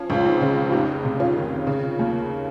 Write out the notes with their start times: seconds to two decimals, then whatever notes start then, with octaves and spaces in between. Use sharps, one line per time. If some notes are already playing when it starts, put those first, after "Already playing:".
Already playing: F3 C#4
0.10 C#2 F4
0.25 C4 D#4
0.41 C#3
0.69 F4
0.72 F1 D#4 G4
1.05 C3
1.20 C#4 F4
1.36 D#3
1.67 C#3
1.99 D#2